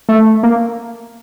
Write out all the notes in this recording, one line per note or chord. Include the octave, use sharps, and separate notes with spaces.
A3
A#3